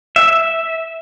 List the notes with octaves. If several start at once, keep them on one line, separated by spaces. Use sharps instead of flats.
E5